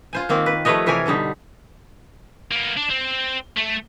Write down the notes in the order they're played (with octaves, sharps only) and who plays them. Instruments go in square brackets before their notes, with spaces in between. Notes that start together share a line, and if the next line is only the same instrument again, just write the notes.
[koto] F4 C5 G#5
D#3 A#3 C4
B4
F3 G3 A3 B4 C#5 D#5
C3 E3 A#4 C#5 G#5
B2 D3 G3 D#4
[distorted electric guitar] A#3 B3
D4
C4
A3